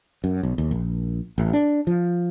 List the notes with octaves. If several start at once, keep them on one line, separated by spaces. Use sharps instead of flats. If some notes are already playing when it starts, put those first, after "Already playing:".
F#2
B1
D#2
A#1
A1
D4
F3